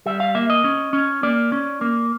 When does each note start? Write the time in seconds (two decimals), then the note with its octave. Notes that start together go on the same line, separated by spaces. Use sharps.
0.06 G3 E5
0.20 F5
0.35 A#3 E5
0.50 D#5
0.64 C#4
0.93 C#4
1.23 A#3 D5
1.52 C#4
1.81 A#3